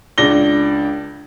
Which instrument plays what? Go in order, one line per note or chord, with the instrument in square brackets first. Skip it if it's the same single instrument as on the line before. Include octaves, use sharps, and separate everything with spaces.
[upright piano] C#2 D4 A#6 G7